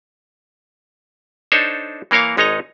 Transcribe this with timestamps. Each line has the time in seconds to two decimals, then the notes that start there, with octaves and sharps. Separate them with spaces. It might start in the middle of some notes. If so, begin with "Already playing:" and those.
1.52 D4 D#4 A4 C5 C#5
2.11 E3 A#3 A#4 C#5 F5
2.37 G#1 G#3 D#4 C#5 D#5 A#5